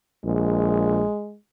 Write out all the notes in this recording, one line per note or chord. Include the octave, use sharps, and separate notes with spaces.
A#1 G#3